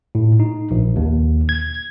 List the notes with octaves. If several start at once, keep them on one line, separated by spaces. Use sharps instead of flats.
A2
D#4
A#1
D#2
G#6